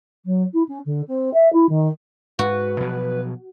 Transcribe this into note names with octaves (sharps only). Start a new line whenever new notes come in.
F#3
E4
C#4
D3
C4
E5
E4
D#3
G#2 F#4 B4
B2 F3 F#3